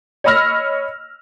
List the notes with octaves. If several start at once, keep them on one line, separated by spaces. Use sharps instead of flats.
C#5 D#5 B5 E6 F6 A#6